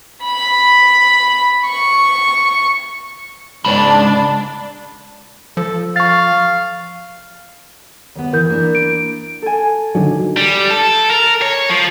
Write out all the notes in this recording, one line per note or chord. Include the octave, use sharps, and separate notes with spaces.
B5
C#6
C#2 G#2 D4 A5 B5
F3 A4
F5 C#6 A6
D#2 B3
E3 A#4 G6
A#3 D4 E4
D7
A4 G#5
D3 D#3 F#3
G3
A4
A#4
C#5
F3